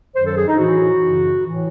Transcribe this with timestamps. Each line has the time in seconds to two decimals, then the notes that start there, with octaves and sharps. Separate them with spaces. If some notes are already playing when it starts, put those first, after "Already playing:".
0.14 F#2 D#3 F#3 C5
0.25 A4
0.37 G#4
0.47 D#4
0.58 A2 E3 F#4
1.01 F#2 C#3 E3
1.45 A2 E3